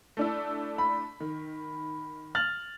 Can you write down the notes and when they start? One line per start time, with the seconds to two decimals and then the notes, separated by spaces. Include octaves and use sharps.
0.17 A3 D4 E4
0.78 B5
1.20 D#3
2.35 F6 A6 F#7